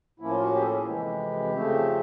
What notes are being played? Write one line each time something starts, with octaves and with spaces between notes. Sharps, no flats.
A2 F3 A#3 C#4 E4
F4
F#4
G4
G#4
A4
G#4
F2 C3 E3 G#3 G4
F2 C#3 F3 A3 C4